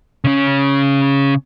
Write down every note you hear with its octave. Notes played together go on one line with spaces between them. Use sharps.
C#3 C#4